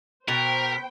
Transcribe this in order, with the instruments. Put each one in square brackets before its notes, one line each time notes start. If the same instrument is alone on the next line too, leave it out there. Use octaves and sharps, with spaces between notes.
[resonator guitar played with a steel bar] B2 [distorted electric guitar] A#4 [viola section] C5 G5 [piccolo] B6